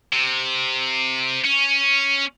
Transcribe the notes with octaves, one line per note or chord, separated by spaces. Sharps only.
C3
C#4